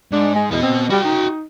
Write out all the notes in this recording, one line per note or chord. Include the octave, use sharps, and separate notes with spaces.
G#2 D4
G#3
E2 B3 D#5
C4
G3 F#4 G5
D#4